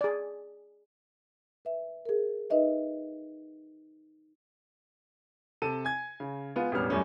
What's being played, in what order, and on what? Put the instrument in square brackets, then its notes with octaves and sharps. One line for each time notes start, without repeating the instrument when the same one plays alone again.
[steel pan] G#4 D5
[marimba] B4 E5
G#4 A#4
D#4 B4 D#5 E5
[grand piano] C3 A4 D#7
G#5 G#6
C#3
G#3 B3 F4
E1 A1 G3 B3 C#5 F6
F#2 G3 A3 C#4